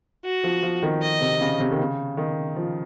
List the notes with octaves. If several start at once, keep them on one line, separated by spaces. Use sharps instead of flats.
F#4
F3
F3
D#3
D#5
C3
C#3
C3
D#3
C#3
D#3
F3